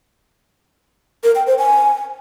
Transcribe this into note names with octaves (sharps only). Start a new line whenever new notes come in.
A#4
G5
C5
G#5